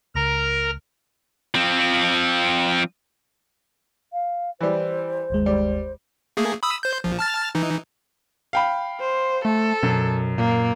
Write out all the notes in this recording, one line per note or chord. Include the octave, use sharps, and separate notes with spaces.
C#2 A#4 A#5 A#6
F3 C4
F5
E3 G3 C5
G1 D#2 G#3
G3
A3 A#3 G#4
B5 D#6 E6
C5 G6
A#1 F3
A5 F6 A6
E3 D#4
F5 G5 B5
C5
A3 A4
F#2 B2
A#2 A#3